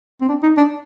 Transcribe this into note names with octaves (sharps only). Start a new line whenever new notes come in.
C4
D4
D#4
D4